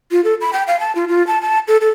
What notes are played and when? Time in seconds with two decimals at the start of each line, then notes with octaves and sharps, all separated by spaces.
0.12 F4
0.24 A4
0.41 B5
0.53 G5
0.67 F5
0.80 A5
0.95 F4
1.08 F4
1.27 A5
1.41 A5
1.68 A4
1.81 A4